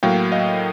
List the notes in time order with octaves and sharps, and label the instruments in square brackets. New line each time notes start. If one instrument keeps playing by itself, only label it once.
[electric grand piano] A2 F#3 A#3 F5 G5
D#5 F5